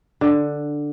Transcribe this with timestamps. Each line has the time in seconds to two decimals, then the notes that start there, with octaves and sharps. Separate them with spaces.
0.21 D3